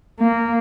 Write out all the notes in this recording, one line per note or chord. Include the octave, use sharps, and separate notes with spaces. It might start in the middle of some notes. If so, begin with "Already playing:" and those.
A#3